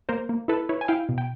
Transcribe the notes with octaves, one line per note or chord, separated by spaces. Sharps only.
A#3 A#4 C5
A#3
E4 A4 B4
E4 B4 C#5
G#5
E4 F5 G5
B2
G5